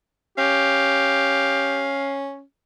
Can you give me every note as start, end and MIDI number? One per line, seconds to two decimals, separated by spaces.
0.38 2.42 61
0.38 1.94 67
0.38 2.15 77